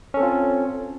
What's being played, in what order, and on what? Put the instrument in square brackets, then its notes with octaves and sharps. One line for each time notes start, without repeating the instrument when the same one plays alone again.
[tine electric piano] C#4
A4
C4
F4